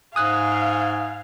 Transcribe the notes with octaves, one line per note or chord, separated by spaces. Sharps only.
G#2 F5 G#5 D#6 F#6